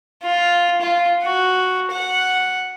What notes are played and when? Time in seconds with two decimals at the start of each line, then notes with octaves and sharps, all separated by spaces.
0.23 F4
0.81 F4
1.24 F#4
1.91 F#5